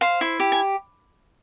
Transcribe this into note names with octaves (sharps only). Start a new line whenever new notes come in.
C5 F5
E4
G4
G#5